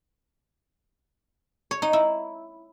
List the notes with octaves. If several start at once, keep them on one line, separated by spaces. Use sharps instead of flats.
C#5
D#4
E4